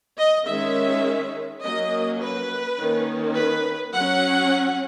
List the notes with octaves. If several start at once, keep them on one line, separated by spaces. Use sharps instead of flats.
D#5
D#3 G#3 C#4 E5
F#3 A#3 C#4 D#5
B4
D#3 A#3 C#4
B4
F#3 C#4 F#5